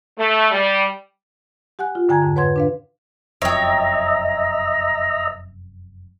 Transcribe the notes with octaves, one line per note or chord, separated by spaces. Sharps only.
A3
G3
G4 F#5 G#5 F#6
F4
G2 D3 G5 G#5 A#5 G#6
F2 G#2 D3
B4 C#5 F#5 C6 G#6
D4 B4 F5
F1 F#2 C#5 D#5 E5 G5 A#5